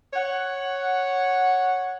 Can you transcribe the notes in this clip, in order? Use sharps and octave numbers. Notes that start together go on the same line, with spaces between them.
C#5 F#5